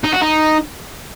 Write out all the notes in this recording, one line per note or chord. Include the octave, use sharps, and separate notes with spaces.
D#4
F#4
D#4